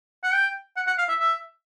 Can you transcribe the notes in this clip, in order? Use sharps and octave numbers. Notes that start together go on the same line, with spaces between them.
F#5
G5
F#5
F#5
F5
E5
E5